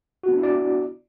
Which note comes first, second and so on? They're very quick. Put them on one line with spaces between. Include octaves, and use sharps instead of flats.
F#4 B3 D4 E4 D5